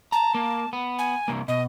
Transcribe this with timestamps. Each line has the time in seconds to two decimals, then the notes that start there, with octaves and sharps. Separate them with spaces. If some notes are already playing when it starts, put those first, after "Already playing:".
0.12 A5 A#5
0.35 A#3
0.73 B3
0.99 G#5
1.28 C2 A#3
1.48 B2 D#5